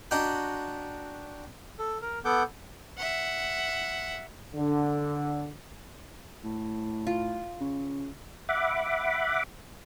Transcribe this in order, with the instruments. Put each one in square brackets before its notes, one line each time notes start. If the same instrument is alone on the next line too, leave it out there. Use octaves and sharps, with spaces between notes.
[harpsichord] D4 F#4 D#5 G5 A#5 B5
[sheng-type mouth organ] A4
A#4
B3 A4 F#5 D6 G6
[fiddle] E5 F#5
[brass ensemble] D3
[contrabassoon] A2
[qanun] F4
[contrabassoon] C#3
[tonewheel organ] E5 F#5 B5 D6